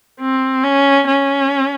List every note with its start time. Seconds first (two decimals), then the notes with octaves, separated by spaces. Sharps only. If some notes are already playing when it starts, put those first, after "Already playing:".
0.20 C4
0.63 C#4
1.07 C#4